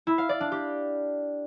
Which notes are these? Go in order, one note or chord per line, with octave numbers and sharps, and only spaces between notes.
E4
F5
D5
D4
G4